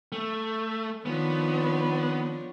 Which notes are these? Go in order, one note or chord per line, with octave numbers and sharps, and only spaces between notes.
A3
D#3 F3 B3 D4 C#5